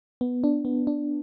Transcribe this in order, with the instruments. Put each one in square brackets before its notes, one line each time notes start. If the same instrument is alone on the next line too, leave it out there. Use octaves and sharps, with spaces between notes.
[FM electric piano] B3
D4
B3
D4